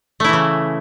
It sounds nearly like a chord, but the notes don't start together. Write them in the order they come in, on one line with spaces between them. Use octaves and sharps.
A3 E4 E3 C#3